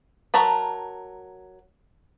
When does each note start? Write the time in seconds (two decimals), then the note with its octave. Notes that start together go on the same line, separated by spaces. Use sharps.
0.34 F#3 A#4 A5 B5